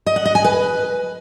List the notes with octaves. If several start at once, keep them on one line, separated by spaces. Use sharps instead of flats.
D#5
F#5
D#5
G#5
B4